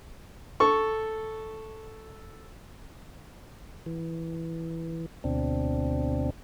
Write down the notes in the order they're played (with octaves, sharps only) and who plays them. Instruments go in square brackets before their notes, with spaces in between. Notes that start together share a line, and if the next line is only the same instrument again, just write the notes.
[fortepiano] A4 C#6
[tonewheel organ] E3
D2 B2 C4 D4